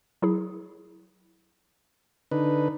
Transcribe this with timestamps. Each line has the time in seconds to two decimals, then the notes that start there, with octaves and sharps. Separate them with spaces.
0.22 F#3 E4 G#4
2.31 D3 D#4 B4